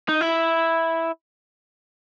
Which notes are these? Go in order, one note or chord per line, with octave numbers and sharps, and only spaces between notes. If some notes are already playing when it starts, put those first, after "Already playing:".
D#4
E4